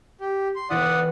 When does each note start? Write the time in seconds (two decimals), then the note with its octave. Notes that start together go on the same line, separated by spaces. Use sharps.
0.21 G4
0.56 C6
0.70 E1 E3 E4 D5 F#5 D#6